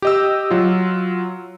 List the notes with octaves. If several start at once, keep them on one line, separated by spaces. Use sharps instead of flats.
G4 D#5 E6
F#3 F4